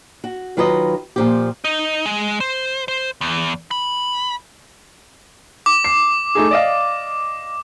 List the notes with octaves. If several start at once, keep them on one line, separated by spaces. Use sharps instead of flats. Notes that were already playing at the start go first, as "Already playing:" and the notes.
F#4
D#3 F#3 F4 B4 D5 D#5
A#2 F3 G4
D#4
G#3
C5
C5
E2
B5
D6
C7
A3 D#4 G#4
D5 D#5 F5